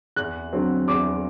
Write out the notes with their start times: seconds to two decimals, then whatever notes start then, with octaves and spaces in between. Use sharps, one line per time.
0.16 E2 F#6
0.53 D3 F#3 C4
0.87 E2 D6